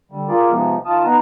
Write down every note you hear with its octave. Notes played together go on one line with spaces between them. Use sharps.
D3 G3
F4 G#4 A#4 D5
C3 F3 G#3 B3 D#4
D#3 F4 A5 D#6
B3 D#4 B4 A#5